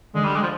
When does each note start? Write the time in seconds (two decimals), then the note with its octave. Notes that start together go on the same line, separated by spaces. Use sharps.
0.14 D3 G#3
0.25 G3
0.36 G#3
0.42 F3